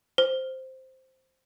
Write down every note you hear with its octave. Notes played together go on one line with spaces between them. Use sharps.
C5